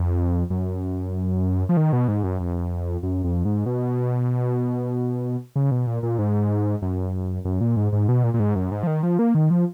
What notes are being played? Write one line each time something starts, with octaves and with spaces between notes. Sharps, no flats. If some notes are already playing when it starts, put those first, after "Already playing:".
Already playing: F2
F#2
F3
D#3
B2
G#2
F#2
F2
F#2
F2
G#2
B2
C#3
B2
A#2
A#2
G#2
F#2
F#2
A#2
G#2
G#2
B2
A#2
A#2
G#2
F#2
G#2
F3
D#3
F3
A#3
D#3
F3